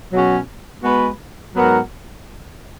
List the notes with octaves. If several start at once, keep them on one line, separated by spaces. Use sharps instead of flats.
B2 F#3 C#4 F#4
G#3 B3 F#4 B4
G#2 F#3 B3 F#4 A#4